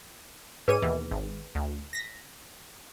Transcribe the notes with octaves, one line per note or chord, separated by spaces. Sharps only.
G#2 G#4 B4 C#5 D#7
D#2 B2 E3
G#1
D2
A#6 B6